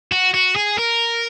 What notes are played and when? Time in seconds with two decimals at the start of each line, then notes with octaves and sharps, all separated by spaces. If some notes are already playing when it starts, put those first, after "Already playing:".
0.12 F#4
0.34 F#4
0.56 G#4
0.79 A#4